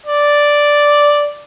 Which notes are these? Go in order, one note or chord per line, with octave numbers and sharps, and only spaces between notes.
D5